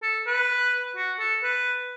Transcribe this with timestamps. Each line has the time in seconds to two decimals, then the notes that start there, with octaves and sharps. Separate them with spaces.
0.03 A4
0.27 B4
0.96 F#4
1.19 A4
1.43 B4